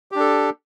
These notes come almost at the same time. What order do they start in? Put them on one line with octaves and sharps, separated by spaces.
G4 D4 A4